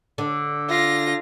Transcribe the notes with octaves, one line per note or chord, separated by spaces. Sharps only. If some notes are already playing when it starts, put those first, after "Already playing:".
D3
F4 A#6